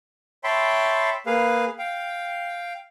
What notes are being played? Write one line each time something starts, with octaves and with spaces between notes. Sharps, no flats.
C#5 E5 G5 A5 B5 C6
A#3 G#4 B4 F5
F5 G5